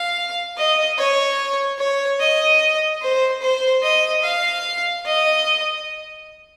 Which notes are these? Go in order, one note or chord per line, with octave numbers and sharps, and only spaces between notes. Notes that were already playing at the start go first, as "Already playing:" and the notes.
Already playing: F5
D#5
C#5
C#5
D#5
C5
C5
D#5
F5
D#5